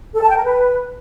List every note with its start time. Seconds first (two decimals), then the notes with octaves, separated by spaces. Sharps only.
0.15 A4
0.22 A5
0.29 G5
0.36 A#4
0.43 B4